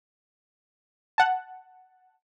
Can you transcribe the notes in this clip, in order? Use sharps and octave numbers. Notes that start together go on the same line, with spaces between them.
F#5 A5